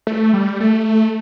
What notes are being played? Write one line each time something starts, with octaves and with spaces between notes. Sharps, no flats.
A3
G3
A3